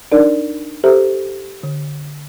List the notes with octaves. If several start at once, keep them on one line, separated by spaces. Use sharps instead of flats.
D4 D#4 A#4 D5
G4 A4 C5 E5 A#5
D3